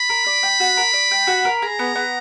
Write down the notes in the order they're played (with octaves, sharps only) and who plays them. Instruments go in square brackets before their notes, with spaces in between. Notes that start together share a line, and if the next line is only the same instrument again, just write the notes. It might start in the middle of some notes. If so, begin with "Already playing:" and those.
Already playing: [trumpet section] B5
[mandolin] A#4
D5
G5
F#4
A#4
D5
G5
F#4
A#4
[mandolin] G#4 [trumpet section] A#5
[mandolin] B3
B3